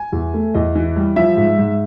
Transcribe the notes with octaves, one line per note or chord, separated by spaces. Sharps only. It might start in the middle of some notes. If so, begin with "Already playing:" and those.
Already playing: G#5
E2
A3
E2 D#5
E3
G3
F3 E5
G#2
G#2